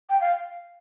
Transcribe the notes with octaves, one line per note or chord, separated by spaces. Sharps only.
G5
F5